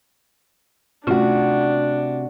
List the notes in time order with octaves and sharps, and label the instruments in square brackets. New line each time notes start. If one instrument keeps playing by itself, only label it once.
[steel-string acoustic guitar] C3 F#4 [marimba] A3 C#4 F4 [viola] D4